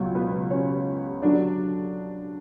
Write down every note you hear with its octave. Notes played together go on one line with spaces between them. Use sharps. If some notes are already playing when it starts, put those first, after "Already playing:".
Already playing: C#2 B2 F#3
B3 B4
C#4 C#5
D3 F#3 D4 D5